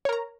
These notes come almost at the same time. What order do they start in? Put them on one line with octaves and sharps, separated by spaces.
C#5 A#4 A#5